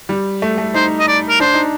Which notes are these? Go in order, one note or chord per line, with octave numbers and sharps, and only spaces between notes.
G3
A3
A3
D#4 C5
D#5
D5
A#4
D4 C5
D#4